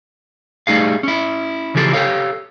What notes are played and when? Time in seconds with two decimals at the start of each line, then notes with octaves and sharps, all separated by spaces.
0.67 G3 A3 D#4 G#4 F5
1.03 C#4 E4
1.75 C#3 E3 F3 G4 A4
1.93 G4 A4 C#5 F5